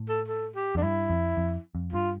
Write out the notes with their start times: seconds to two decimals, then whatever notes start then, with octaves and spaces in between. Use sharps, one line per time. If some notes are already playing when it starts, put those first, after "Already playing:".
Already playing: A2
0.09 A4
0.28 A4
0.56 G4
0.75 F2 D4
0.82 G2 E4
1.10 F2
1.37 F2
1.75 F2
1.93 G2 F4